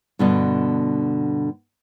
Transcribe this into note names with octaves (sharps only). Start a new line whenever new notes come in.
G2 B2 D3